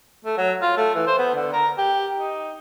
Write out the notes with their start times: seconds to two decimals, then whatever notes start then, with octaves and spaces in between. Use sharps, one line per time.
0.25 A3
0.37 F#3
0.62 F4
0.77 A3
0.95 E3
1.07 C5
1.18 B3
1.35 D3
1.53 A#4
1.78 G4
2.17 D#4